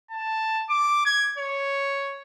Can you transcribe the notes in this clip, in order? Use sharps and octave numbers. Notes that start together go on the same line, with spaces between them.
A5
D6
G#6
C#5